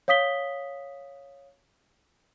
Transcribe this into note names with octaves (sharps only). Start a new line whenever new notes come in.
C#5 F5 D#6 B6 G7